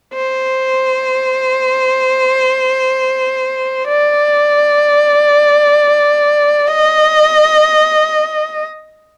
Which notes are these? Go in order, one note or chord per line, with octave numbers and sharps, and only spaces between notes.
C5
D5
D#5